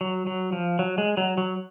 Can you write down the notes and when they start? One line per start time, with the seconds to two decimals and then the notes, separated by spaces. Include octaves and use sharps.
0.01 F#3
0.27 F#3
0.53 F3
0.79 F#3
0.98 G#3
1.17 F#3
1.38 F#3